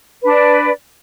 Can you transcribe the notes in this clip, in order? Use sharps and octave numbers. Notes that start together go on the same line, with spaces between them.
D4 B4 D5